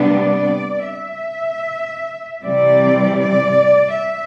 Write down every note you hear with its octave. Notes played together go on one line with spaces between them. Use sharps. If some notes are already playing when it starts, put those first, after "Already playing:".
Already playing: C3 G3 B3 D4
D5
E5
C3 E3 G3 C4 D5
D5
E5